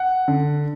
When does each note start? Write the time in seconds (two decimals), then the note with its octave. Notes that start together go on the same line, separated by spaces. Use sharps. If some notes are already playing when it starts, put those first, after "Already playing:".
Already playing: F#5
0.28 D3